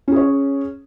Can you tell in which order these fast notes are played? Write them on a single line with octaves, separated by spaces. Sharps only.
C#4 G#4 C#5